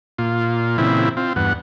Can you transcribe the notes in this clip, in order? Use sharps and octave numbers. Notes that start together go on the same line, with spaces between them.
A#2 F4
A#2 C#3 E3 C4 E4
C4 F4
E2 G2 B3 F#5